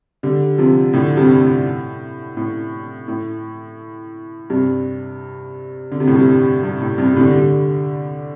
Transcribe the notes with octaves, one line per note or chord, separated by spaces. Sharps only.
D3 G3
C3 F3
A2 D3
G2 C3
A2
A2
A2
G2 C3
D3
C3
A2
G2 C3
G2
A2
G2 C3
C3
A2 D3
D3 G3